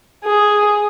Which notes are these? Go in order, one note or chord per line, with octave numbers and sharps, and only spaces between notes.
G#4